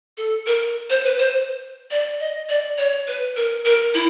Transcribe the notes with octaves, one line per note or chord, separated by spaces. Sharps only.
A4
A#4
C5
B4
C5
D5
D#5
D5
C#5
B4
A#4
A#4
E4